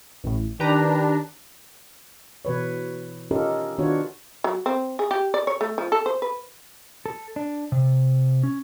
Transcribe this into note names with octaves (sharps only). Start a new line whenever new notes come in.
A1 A2
D#3 D4 G4 B4 A#5
B2 E3 B4 C#5
C#4 D#4 F4 G4 A4 A#4
D#3 B3 D4 F4 F#4 C#5
F#3
C4
G#4
G4
D5
C#5
A3
F3
A4
C5
B4
A4
D4
C3
C#4